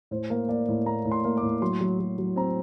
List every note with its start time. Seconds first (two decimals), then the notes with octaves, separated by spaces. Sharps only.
0.11 A2 C5
0.30 A#3
0.49 A#3 D5
0.68 A2
0.86 A#3 A#5
1.05 A2
1.11 C6
1.25 A#3
1.37 D6
1.43 A2
1.62 F#3 C6
1.81 F#3
2.00 F#3
2.18 F#3
2.36 C4 A#5